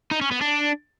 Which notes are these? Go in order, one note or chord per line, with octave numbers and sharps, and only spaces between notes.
D#4
C#4
B3
D4